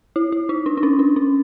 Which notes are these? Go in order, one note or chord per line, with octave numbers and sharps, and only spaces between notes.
E4
E4
D#4
D4
D4
C#4
D4
C#4